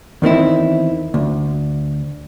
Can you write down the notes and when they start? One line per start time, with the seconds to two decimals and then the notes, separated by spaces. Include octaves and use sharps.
0.22 E2 D#3 C4 E4
1.14 D2